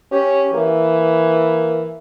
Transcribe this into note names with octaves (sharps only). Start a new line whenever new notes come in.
C#4 G4
E3 A#3